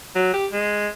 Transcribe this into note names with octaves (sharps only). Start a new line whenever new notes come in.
F#3
G4
G#3